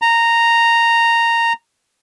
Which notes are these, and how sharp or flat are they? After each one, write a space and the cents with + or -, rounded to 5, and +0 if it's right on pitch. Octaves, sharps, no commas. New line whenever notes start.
A#5 -10